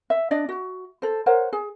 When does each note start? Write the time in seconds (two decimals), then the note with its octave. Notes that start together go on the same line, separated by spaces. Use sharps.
0.10 E5
0.31 D4 D5 D#5
0.49 F#4
1.02 A4 C5
1.26 A#4 C5 C#5 F#5
1.53 G#4